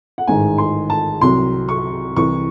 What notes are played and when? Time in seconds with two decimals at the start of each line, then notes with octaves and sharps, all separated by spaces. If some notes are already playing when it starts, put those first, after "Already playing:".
0.18 F#5
0.27 A1 G#2 D#3 G#3 G#5
0.58 C6
0.90 A5
1.21 C2 C3 F#3 C6
1.69 C#6
2.16 C2 C3 E3 C#6